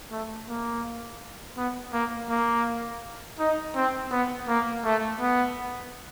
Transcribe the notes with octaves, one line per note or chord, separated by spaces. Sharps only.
A3
A#3
B3
A#3
A#3
D#4
C4
B3
A#3
A3
B3